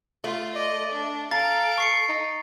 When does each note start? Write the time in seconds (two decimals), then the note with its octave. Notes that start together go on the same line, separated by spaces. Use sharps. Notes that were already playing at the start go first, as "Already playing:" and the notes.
0.24 A3 F4
0.56 D5 D#5
0.93 D4
1.31 A4 F5 A#5 A6 D7
1.78 C#6 C7 C#7
2.09 D#4